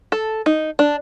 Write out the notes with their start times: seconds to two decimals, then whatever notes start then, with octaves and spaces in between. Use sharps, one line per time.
0.12 A4
0.46 D#4
0.79 D4